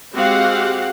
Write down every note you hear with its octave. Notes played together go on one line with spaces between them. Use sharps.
G#3 C4 F#4 G4 F5 F#5